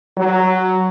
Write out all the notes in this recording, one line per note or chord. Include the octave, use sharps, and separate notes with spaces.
F#3